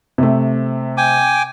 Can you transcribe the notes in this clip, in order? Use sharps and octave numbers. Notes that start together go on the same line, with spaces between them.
C3 A3
G5 G#5 D6